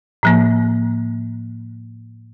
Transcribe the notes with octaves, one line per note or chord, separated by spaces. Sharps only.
A2 F3 A#3